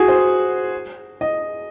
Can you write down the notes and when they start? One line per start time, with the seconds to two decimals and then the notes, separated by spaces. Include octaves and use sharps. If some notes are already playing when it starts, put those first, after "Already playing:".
Already playing: F#4 G#4
0.08 C5
1.21 D#5